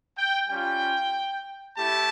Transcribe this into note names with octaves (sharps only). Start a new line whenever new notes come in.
G5
G3 C#4 F4 G5
A3 E4 G4 A5